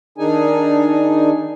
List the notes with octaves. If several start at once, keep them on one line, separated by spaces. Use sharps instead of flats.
D#3 D4 D#4 G#4 G#5